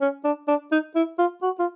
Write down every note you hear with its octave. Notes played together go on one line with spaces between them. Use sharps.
C#4
D4
D4
D#4
E4
F4
F#4
F4